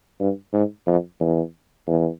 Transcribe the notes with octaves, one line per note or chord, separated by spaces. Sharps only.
G2
G#2
F2
E2
E2